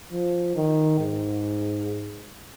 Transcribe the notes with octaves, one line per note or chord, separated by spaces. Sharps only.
F3
D#3
G#2